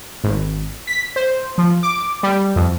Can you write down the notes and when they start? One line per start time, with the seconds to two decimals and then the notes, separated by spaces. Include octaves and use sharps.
0.24 G#1
0.87 B6
1.16 C5
1.58 F3
1.83 D6
2.23 G3
2.56 F2